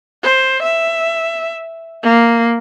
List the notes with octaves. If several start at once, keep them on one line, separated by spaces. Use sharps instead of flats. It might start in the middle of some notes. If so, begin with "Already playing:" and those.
C5
E5
A#3